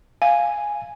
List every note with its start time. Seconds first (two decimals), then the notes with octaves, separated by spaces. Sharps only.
0.22 F5 G#5